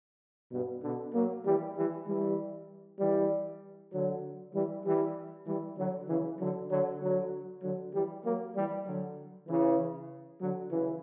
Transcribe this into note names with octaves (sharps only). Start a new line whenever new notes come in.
G2 B2
B2 D3
F#3 A#3
E3 G3
E3 G3
E3 G3
E3 G3
D3 F#3
E3 G3
E3 G3
E3 G3
D3 F#3
C#3 E3
D3 F#3
D3 F#3
D3 F#3
D3 F#3
E3 G3
F#3 A#3
E3 G3
D3 F#3
C#3 E3
D3 F#3
C#3 E3